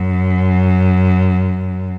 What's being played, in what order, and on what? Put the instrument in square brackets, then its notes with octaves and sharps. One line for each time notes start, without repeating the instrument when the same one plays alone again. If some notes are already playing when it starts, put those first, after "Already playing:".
Already playing: [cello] F#2